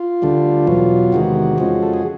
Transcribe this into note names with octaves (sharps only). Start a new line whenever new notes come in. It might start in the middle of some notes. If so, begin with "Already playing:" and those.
Already playing: F4
D2 D3 G3
E2 B2 F#3
E2 C3 D#3 G#3 F#4
F2 C#3 F3 G#3
A4
G#4